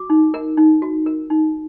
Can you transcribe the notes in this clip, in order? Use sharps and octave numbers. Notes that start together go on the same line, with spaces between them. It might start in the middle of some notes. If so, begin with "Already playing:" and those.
Already playing: F#4 D6
D#4
A#4
D#4
F#4
A#4
D#4